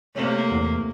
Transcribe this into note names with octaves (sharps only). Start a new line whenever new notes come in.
C3 A3 A#3 C#5
E2